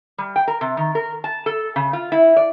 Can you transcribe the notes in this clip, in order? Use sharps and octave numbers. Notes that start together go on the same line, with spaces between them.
G3
G5
A#4
C3
D#3
A#4
A5
A4
C#3
F4
E4
D5